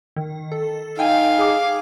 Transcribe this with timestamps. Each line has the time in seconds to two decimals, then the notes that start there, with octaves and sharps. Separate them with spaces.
0.16 D#3
0.52 A4
0.99 D#4 F5 G5 G#5
1.39 G#4 D6